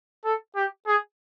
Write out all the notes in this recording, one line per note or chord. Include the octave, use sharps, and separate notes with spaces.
A4
G4
G#4